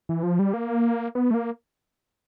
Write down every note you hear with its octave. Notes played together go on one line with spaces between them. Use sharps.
E3
F3
G3
A#3
B3
A3
A#3